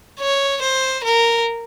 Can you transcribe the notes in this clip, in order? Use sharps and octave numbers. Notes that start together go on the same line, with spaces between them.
C#5
C5
A#4